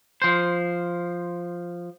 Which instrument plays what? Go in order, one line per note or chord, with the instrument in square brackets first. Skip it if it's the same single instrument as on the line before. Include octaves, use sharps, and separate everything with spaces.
[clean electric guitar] F3 C5